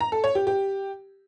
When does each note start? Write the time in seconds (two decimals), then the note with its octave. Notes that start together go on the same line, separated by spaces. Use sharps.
0.01 A#5
0.12 A4
0.24 C#5
0.35 G4
0.47 G4